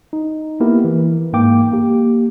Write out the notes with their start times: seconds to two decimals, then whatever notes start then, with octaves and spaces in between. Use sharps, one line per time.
0.13 D#4
0.60 A#3 B3 E4 G4 A#4
0.84 E3
1.33 G#2 A#3 G5 D6
1.72 A#3 G4